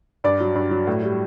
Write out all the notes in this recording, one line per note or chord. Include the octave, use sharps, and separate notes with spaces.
G2 D5
F#3
G2
F#3
A2
G3